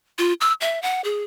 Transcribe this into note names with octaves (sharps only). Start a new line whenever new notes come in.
F4
E6
E5
F#5
G#4